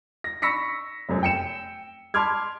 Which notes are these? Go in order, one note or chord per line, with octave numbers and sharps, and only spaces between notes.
A#6
B5 C#6 E6 A#6 B6 C#7
F1 F#2
G5 C#7 E7
A5 B5 C6 D6 F6 G#6